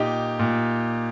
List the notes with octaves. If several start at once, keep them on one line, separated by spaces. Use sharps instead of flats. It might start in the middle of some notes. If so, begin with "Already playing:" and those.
Already playing: A#2 D#4 G4
A#2